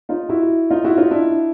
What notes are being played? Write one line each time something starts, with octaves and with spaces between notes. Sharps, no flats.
D#4 F4
E4 F#4
D#4 F4
E4 F#4
D#4 F4
D4 E4